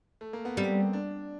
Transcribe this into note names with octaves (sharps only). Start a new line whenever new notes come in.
A3
A#3
B3
G3 C4
D4